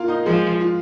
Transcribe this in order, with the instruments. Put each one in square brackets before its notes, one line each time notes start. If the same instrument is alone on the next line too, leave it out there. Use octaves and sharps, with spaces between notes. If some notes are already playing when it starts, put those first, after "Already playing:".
Already playing: [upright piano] A#3 F4 A#4 F5
D#4 D#5
[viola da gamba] F3 [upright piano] G#3 G#4
[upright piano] F4